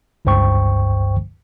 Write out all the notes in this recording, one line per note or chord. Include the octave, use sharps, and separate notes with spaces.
G1 C#2 G2 C5 G5 C#6